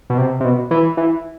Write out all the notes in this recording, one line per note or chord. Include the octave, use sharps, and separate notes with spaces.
B2
C3
C3
B2
E3
E3